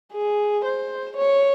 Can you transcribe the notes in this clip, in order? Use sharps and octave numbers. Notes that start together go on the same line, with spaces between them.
G#4
C5
C#5